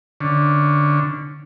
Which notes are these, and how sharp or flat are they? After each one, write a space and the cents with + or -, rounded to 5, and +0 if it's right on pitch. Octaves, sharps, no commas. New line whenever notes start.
D3 +0 C#4 +0